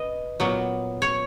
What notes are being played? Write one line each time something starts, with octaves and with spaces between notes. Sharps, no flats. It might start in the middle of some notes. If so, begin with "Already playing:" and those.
Already playing: B4 D#5
A#2 F#3 B3
C#5